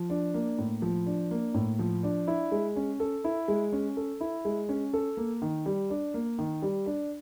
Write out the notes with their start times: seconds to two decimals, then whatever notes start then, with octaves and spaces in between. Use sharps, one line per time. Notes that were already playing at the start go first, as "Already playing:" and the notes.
Already playing: F3
0.10 D4
0.34 A#3
0.58 A2
0.82 F3
1.06 D4
1.31 A#3
1.54 A2
1.79 F3
2.03 D4
2.27 E4
2.52 G#3
2.76 C#4
3.00 A4
3.24 E4
3.48 G#3
3.72 C#4
3.97 A4
4.21 E4
4.45 G#3
4.69 C#4
4.93 A4
5.17 A#3
5.42 D#3
5.66 G3
5.90 D4
6.14 A#3
6.39 D#3
6.62 G3
6.86 D4